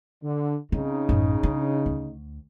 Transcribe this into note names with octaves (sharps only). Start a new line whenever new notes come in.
D3
C#3 C4 D#4
A1 F#2
D4
D2